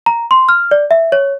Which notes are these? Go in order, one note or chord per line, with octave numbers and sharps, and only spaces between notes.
A#5
C6
F6
D5
E5
C#5